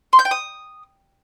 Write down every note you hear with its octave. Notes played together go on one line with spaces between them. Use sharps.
C6
G6
G5
D#6